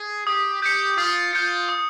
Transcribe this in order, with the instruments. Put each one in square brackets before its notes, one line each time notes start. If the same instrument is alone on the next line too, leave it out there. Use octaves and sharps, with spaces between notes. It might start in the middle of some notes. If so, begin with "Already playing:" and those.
Already playing: [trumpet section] G#4
[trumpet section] G4 [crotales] D#6
[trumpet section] G4 [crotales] G6 C#7
[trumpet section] F4 [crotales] D#6
[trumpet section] F4 [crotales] G6 C#7
[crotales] D#6